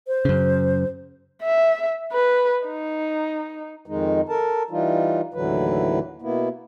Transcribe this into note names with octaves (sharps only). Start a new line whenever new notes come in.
C5
F#2 C#3
E5
B4
D#4
F2 D#3 G#3 D#4
A4 A#4 A5
E3 G3 D#4 F4
D#2 A2 D3 E3 F#3 B4
B2 A#3 B3 E4